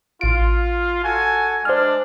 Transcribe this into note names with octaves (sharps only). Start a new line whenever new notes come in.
A1 F4 D7
F#4 A4 G#5
G#3 D4 C5 F6